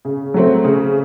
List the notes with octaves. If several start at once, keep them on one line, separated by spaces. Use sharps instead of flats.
C#3
F#3 A3 C4
C#3